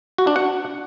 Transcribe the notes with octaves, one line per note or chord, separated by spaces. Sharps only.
F#4
D4
F#5